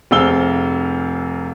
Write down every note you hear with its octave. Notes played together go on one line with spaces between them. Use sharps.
F1 C3 G#4 F5 E6 G7